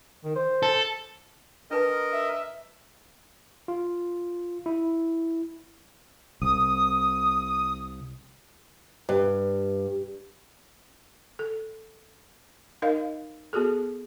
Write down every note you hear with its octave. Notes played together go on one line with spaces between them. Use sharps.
D#3
C5
A4
D4 A#4 B4 D#5 A5
E5
F4
E4
C2 D#6
G2
A4
D#4 A#4 D#5 F5
B3 F#4 G#4 A4